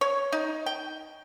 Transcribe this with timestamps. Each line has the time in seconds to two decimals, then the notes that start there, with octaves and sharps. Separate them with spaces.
0.01 C#5
0.32 D#4
0.66 G5